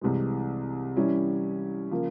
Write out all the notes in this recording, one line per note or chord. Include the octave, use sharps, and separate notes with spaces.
C2 C3 E3 G#3
E3 G3 C#4 E4
C#3 F3 A#3